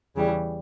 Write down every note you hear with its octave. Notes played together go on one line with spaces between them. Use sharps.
E2 C#3 E3 G3